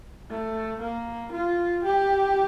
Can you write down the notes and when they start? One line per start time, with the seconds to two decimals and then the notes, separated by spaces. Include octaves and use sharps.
0.29 A3
0.80 A#3
1.32 F4
1.83 G4